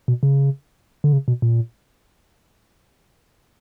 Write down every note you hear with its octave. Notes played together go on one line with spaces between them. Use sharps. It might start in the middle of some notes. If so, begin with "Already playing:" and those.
B2
C#3
D3
C#3
B2
A#2